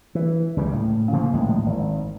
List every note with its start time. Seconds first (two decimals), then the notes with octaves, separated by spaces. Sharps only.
0.15 E3
0.57 C#2 C#3 E3 G3
0.73 A2
1.12 C#3 F3 A#3
1.33 A#1 D#2 A2 G#3
1.66 G#1